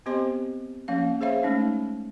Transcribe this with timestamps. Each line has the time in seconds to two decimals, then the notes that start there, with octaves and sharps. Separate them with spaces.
0.06 B3 C4 G4 C5 D#5 C6
0.88 F3 A#3 C#4 F5
1.21 G#4 C5 C#5 E5 F5
1.43 G#3 A3 C#4 D#4